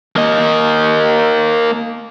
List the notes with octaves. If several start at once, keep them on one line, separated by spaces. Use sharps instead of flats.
A#3 D#5